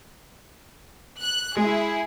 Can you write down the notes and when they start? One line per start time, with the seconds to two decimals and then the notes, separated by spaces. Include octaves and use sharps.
1.20 F#6
1.57 G#3 E4 G#4